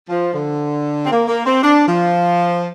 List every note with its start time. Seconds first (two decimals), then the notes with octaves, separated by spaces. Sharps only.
0.09 F3
0.34 D3
1.05 C4
1.11 A#3
1.28 A#3
1.45 C4
1.62 D4
1.88 F3